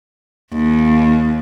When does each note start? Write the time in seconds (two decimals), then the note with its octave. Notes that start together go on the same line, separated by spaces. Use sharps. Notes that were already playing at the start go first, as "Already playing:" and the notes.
0.53 D#2